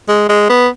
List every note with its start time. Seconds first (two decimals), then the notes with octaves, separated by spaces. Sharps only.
0.09 G#3
0.29 G#3
0.49 B3